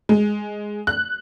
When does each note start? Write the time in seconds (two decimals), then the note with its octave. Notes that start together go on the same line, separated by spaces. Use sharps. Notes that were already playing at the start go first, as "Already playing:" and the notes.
0.09 G#3
0.87 F#6